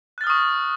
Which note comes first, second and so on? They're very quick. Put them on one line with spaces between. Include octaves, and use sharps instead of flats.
F#6 A6 F6 D#6 C#6